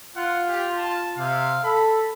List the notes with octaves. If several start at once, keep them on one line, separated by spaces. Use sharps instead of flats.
F4 F#5
G4
A5
C3 F5
A4 B5